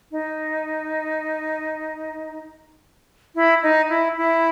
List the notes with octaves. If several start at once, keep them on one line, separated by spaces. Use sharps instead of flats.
D#4
E4
D#4
E4
E4